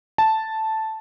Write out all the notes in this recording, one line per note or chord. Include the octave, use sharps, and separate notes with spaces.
A5